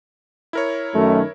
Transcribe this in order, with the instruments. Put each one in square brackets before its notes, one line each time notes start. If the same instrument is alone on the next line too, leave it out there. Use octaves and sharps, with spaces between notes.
[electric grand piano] E4 A#4 C#5
[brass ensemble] F#2 D#3 [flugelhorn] A3